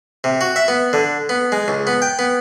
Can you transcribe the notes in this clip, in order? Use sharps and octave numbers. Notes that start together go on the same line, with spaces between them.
C3
F#4
E5
B3
D3
B3
G#3
C#2
B3
G5
B3